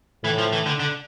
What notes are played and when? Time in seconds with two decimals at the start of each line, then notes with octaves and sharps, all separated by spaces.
0.24 A2 E3
0.38 F3
0.53 E3
0.66 D3
0.80 D3